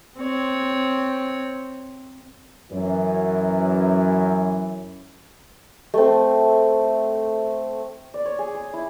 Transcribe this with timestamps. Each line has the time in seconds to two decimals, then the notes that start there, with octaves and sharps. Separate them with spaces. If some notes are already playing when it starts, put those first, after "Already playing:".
0.19 C4 C#5
2.71 F#2 E3
5.94 A3 C4
8.14 D5
8.25 C#5
8.39 G#4
8.55 D6
8.73 E4